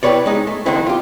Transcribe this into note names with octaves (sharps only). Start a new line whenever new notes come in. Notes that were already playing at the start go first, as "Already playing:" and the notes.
E4 G4 A#4 B4 C#5 D5
G#3 D#4
A3
F2 D3 D#3 C4 E4
F4 G4